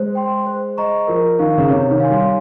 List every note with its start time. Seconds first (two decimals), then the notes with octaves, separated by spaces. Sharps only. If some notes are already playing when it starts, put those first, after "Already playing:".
Already playing: G#3 C5
0.15 G5 C6
0.47 C5
0.77 D#5 A#5 C#6
1.07 F3 A#4
1.38 D#3 F5 A#5 C#6
1.57 C#3
1.69 C3 C#5
1.90 D#3
2.00 F5 G#5 C6
2.10 G3